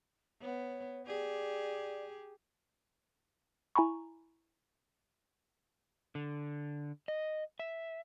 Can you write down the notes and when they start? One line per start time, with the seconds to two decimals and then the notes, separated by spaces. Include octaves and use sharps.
0.42 B3 C#5
1.06 G4 G#4 D5
3.75 E4 G#5 A#5 B5 C#6
6.15 D3
7.08 D#5
7.59 E5